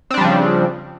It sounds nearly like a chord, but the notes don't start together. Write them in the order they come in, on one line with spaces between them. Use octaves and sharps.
C4 D4 G3 F3 C#3